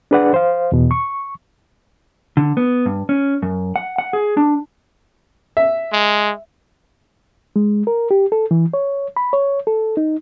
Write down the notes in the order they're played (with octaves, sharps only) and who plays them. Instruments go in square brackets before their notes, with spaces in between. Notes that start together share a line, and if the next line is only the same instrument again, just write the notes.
[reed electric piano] D4 G#4 B4 D5 F#5
C5 F5
E2 B2
C#6
[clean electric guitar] D3
B3
G2
C#4
F#2
F#5
F#5
G#4
D4
[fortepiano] E5
[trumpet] G#3
[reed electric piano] G#3
A#4
G4
A4
E3
C#5
B5
C#5
A4
D#4